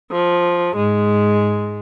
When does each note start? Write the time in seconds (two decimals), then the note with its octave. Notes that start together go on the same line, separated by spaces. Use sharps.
0.10 F3
0.74 G#2 G#3